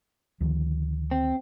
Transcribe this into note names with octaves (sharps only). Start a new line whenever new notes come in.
D2 D#3 F3
C4